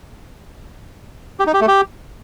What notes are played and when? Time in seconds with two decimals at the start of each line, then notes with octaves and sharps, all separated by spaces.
1.40 G4
1.47 D#4
1.54 G4
1.61 A3
1.68 G4